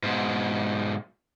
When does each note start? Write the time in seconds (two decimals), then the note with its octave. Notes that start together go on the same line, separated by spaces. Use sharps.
0.03 G#2 B2